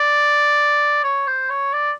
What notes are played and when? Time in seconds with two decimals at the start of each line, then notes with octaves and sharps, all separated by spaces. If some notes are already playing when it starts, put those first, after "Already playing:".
Already playing: D5
1.04 C#5
1.27 C5
1.50 C#5
1.73 D5